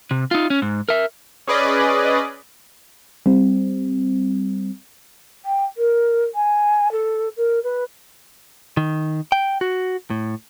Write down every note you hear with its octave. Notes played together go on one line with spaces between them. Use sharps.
C3
D#4 F4
C#4
G#2
A#4 E5
C#4 G#4 B4 D5 D#5
G3 C4
G5
A#4
G#5
A4
A#4
B4
D#3
G5
F#4
A2